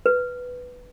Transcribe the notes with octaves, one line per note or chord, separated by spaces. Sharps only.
B4